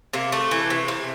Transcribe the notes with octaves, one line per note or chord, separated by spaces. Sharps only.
C3 A#3
A3
E3
C3
C3